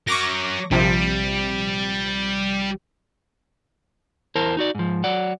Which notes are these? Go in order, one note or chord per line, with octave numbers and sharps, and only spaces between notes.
F#3 A#4 C#6 D6 A#6
A#1 C3 F3 G3
E2 E4 A#4 C5 A5
D#4 F#4 D5
G#2 F3
F#3 D5 F#5